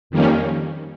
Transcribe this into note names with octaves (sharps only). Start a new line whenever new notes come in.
F2 D#3 G3 A#3 C#4